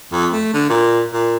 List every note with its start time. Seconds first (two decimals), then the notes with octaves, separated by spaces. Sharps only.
0.13 F2
0.33 A3
0.54 D3
0.69 A#2
1.13 A#2